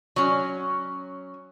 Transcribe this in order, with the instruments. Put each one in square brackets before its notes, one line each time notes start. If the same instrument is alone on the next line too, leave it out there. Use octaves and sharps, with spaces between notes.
[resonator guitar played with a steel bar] F#3 C#4